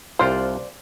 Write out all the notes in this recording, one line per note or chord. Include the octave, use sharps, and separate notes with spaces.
C2 F4 C5 D5 F5